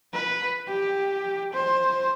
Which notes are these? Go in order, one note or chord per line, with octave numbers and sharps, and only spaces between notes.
B4
G4
C5